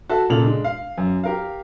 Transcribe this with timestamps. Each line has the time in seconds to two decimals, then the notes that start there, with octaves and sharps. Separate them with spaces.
0.09 F#4 A4 E5 A5
0.30 A#2 C#3 A4 F7 F#7
0.44 G#3 D4
0.64 F5
0.98 F#2
1.24 G4 A#4 F5